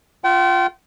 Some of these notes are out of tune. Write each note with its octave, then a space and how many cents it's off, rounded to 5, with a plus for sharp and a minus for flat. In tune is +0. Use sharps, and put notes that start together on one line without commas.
F4 +0 G5 -40